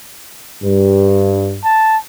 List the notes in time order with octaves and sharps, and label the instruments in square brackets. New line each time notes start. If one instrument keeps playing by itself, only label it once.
[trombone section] G2
[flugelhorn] A5